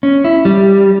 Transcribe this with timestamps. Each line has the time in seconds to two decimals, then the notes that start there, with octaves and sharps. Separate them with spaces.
0.03 C#4
0.25 E4
0.45 G3